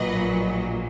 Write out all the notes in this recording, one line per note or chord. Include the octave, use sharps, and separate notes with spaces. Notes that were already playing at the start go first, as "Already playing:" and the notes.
Already playing: A#1 A#2 F#3 B4 D#5